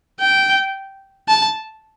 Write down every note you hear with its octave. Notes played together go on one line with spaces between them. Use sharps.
G5
A5